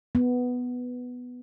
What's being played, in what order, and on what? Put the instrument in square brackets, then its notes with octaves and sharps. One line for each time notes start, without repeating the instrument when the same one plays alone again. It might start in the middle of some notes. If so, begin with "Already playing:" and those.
[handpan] B3